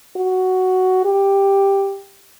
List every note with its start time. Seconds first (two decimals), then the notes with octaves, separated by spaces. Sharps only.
0.16 F#4
1.05 G4